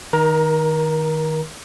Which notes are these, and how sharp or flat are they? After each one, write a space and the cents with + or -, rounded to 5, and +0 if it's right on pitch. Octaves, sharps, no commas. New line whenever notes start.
D#3 +0 A#4 +30 A#5 +0